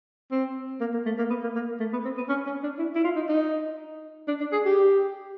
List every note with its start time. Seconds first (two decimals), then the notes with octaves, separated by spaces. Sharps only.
0.32 C4
0.81 A#3
0.94 A#3
1.06 A3
1.18 A#3
1.30 B3
1.44 A#3
1.56 A#3
1.80 A3
1.93 B3
2.05 C4
2.17 B3
2.29 C#4
2.47 C#4
2.63 D4
2.79 E4
2.95 E4
3.04 F4
3.16 D#4
3.29 D#4
4.28 D4
4.41 D4
4.53 G#4
4.66 G4